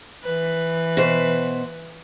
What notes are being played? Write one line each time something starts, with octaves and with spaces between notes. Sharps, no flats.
E3 B4
B2 C5